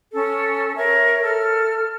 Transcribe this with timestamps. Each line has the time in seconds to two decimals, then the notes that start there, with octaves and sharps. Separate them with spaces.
0.13 C#4 A4
0.77 A#4 C#5 E5
1.23 A4 F6